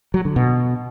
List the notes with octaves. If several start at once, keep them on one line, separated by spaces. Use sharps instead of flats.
F#3
D3
B2